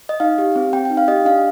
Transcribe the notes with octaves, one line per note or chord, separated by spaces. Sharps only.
D#5
D#4 F5
G4
C4
C4 G5
D#4 G5
F5
G4 D#5
D4 F5